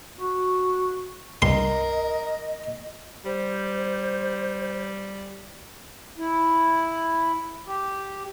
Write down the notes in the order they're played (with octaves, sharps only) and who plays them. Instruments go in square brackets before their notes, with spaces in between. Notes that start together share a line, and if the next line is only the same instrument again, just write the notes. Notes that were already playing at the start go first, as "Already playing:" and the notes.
[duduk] F#4
[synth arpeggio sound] C2 G2 G3 [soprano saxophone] A#4 [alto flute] D#5 [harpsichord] C6
[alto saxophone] G3 [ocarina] C5
[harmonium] E4
G4